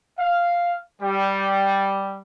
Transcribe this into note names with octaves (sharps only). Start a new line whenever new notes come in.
F5
G3